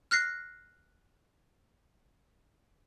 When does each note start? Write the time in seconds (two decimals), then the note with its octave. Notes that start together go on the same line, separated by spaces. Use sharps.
0.11 F6 F#6 A#6 C7